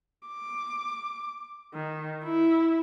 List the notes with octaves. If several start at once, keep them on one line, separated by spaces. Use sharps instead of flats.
D6
D#3
E4